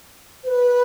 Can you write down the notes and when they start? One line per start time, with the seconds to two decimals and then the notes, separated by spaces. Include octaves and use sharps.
0.43 C5
0.47 B4